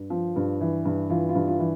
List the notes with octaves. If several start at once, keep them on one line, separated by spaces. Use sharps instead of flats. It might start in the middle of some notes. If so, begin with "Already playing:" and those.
Already playing: G2
F3
G2
E3
G2
E3 F4
F4
G2
F4
E3